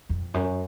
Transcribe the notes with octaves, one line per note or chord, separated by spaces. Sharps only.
F2
F#2